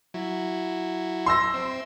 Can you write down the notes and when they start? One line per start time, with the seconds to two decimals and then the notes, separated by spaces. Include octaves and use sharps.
0.14 F#3 E4
1.26 C6 E6 A#6
1.54 C4 E5